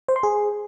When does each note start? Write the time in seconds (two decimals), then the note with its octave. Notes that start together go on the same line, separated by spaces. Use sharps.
0.08 C5
0.16 C6
0.23 G#4